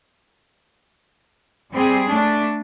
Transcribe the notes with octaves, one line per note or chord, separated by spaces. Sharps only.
G3 C4 G#4
A3 D4